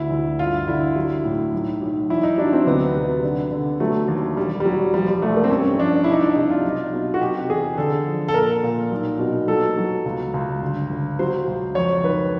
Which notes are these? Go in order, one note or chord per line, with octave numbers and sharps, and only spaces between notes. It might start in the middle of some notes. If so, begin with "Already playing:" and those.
Already playing: D2 E4
D2
G2 F4
D3 E4
F#3
A2
B1
B1
E2 E4
D#4
F#3 D4
C4
D2 B3
C3
D3
D3
F#3 A3
D#2
E1 G3
G3
E1 F#3
F3 G3
G3
C2 A3
A#3
C4
G2 C#4
F3 D4
C2 E4
D#4
D4
C3 D#4
F4
B1
B2
F#4
C3 G4
E2 G#4
D3 A4
F3
A4
A#2 A#4
A#2
B1
B2
F#3 A4
F#3
C#2
C#2
G1
G1
F#3 C5
C#2
F2 C#5
D#3 B4